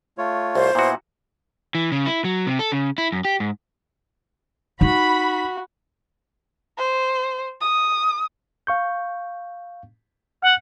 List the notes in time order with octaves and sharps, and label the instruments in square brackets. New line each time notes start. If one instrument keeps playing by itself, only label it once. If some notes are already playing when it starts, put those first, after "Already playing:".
[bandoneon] A3 F4 C#5
[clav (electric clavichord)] C2 [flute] C5
[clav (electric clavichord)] A#2 F#4 [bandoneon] B3 E4
[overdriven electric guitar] E3
C#3
E4
F#3
C3
A4
C#3
E4
F#2
G4
G#2
[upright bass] D#4 [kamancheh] F#4 [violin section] B5
[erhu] C5
D#6
[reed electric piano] F5 C#6 G6
[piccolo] F#5 [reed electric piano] F6 F#6